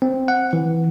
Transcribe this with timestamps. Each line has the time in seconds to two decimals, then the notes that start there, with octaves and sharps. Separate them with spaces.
0.02 C4
0.28 F#5
0.53 E3